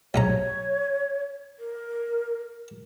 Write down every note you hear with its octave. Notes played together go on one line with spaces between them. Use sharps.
B1 G#2 C#5 A#5
A#4